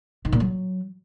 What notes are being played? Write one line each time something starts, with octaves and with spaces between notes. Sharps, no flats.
D#3
A#2
F#3